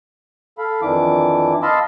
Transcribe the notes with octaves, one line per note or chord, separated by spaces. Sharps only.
A4 F5 B5
F2 D#3 E3 D4 E4 D6
D#5 F5 A5 B5 C6 E6